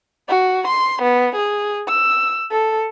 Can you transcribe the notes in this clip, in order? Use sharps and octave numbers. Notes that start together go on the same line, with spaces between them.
F#4
C6
B3
G#4
E6
A4